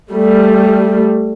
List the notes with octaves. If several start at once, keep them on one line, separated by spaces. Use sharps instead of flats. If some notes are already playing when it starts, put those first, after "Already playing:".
G3 A3